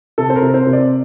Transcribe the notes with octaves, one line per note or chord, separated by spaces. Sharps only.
C3 A4
C5
A#4
C3
C5
C3
D5